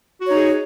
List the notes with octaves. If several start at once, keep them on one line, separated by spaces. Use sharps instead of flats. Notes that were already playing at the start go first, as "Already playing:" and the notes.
D#4 F#4 G#4 C#5